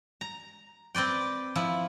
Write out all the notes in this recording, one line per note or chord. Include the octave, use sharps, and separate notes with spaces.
A#5
C4 B4 D5 G5
F3 E4